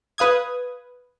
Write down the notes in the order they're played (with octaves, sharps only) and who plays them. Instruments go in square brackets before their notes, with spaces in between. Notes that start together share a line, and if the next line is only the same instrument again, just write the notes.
[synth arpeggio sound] B4 F5 D#6 G#6